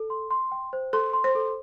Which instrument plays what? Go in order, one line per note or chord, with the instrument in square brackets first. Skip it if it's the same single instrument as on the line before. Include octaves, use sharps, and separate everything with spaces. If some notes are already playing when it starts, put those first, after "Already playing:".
Already playing: [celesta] A4
C6
C6
G5
C5
[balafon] A4 [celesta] C6
[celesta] C6
[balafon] C5
[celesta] A4